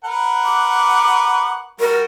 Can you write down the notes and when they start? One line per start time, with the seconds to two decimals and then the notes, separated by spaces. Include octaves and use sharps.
0.04 A#4 B4 F#5
0.45 D6
1.80 G3 F#4 A#4